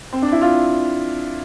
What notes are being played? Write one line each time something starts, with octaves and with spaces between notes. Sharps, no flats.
C4
D4
E4
F4